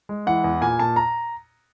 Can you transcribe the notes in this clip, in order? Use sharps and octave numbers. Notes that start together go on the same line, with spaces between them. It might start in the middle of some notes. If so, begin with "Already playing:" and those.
G#3
E3 F#5
E2
A#2 G#5
A#2 A5
A#5